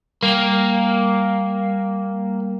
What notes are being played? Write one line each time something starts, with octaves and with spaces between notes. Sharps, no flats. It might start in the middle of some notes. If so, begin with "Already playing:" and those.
G3 A#3